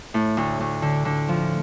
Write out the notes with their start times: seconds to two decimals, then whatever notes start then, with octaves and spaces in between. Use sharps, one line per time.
0.14 A2
0.37 D2
0.60 D2
0.82 D3
1.05 D3
1.28 F3